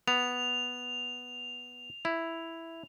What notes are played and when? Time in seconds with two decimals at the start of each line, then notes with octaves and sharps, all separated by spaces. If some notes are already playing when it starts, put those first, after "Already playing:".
0.08 B3 F7
2.05 E4